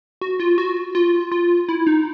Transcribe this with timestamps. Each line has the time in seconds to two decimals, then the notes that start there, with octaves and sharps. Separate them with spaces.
0.21 F#4
0.40 F4
0.58 F#4
0.95 F4
1.32 F4
1.69 E4
1.87 D#4